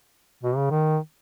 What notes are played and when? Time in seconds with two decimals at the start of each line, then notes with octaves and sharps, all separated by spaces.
0.43 B2
0.56 C#3
0.71 D#3